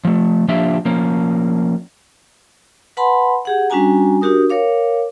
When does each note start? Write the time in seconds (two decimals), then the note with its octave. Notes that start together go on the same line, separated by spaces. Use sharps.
0.05 F3 A3
0.48 F3 A#3 D4 F4 G4 E5
0.85 F3 A#3 C#4
2.97 B4 F#5 A5 B5 C6
3.45 G4 G#4 F#5
3.70 G3 C#4 D4 F#4 G#5 A#5
4.21 D4 F#4 G4 A#4 D#6
4.50 A#4 C#5 F5 D6